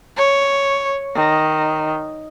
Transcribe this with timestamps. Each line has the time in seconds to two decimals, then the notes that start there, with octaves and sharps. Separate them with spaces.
0.17 C#5
1.15 D#3